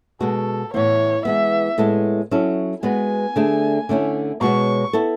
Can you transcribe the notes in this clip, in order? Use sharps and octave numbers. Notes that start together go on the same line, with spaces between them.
B2 G#3 B3 F#4 A4
A2 E3 B3 C#5
E3 G#3 B3 E5
A2 G#3 B3 E4 A4
F#3 C#4 E4 A4
G#3 B3 F#4 B4 G#5
D3 A3 D4 G#4
D3 A3 C#4 E4
B2 G#3 B3 F#4 C#5 C#6
B3 E4 A4